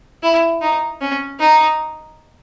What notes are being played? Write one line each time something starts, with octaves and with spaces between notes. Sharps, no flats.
E4
D#4
C#4
D#4